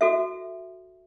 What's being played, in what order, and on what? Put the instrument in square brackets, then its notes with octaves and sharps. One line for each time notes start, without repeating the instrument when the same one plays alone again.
[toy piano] F#4 A4 E5